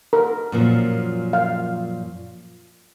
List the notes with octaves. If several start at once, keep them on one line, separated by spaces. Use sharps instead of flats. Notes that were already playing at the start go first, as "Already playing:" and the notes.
A#4
F#2 A#2 F3
F5